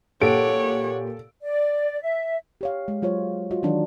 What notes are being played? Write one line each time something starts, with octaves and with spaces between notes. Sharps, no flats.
A#2 G4 A4 C#5 F#5 D7
D5
E5
G4 C#5 F5
G#3
F#3 F4 C5 C#5
F4 F#4 D#5
D#3 E3 F#3 D4 D#4 A#4